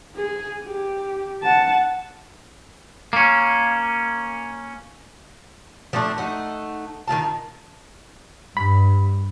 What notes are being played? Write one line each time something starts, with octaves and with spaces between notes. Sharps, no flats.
G#4
G4
F#5 A5
A#3 C#4
F3 A3 C4 D4
A3 D#4 F#5
D#3 D#4 F4 A5
G2 B5